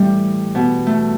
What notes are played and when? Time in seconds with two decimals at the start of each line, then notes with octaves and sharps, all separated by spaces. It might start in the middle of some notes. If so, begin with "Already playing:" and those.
Already playing: A2 E3 G3 A3
0.55 B2
0.87 A3